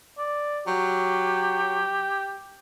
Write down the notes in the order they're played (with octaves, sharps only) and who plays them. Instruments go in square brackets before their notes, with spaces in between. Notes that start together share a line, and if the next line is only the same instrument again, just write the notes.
[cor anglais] D5
[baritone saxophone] F#3 [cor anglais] G4